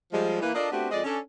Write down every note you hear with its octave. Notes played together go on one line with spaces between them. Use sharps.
F3 G3 G#3
E3 A#3 B4
D4 F4 A4 A#4 D5 D#5
A3 B3 C4 D4 F#4 G4
F2 G#3 D5 D#5
C#4 D4 A4